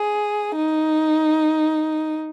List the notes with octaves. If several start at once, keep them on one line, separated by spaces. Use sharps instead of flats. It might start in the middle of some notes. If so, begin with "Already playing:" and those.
Already playing: G#4
D#4